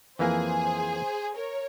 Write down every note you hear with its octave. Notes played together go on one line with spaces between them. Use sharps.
F2 E3 A#3 G#4 C5
A#4 C#5